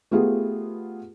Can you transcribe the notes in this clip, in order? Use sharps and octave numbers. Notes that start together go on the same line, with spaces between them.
A3 B3 F4 G4 G#4